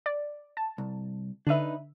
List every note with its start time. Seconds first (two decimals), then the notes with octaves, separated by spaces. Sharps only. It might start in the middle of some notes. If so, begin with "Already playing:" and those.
0.06 D5
0.57 A5
0.78 C2
1.47 D3 D4 D#4 B4 E5